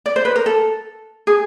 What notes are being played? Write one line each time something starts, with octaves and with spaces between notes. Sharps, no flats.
D5
C5
B4
A#4
A4
G#4